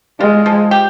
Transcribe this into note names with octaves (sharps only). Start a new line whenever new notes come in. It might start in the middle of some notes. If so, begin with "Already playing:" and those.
G#3 F4
F3
G4